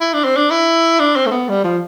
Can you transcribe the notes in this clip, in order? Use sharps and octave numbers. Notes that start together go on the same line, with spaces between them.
E4
D4
C4
D4
E4
D4
C4
A3
B3
G3
F3